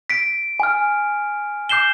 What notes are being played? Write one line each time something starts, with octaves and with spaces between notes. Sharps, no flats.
B6 D7
G#5 F6
D6 G6 C7 E7 G7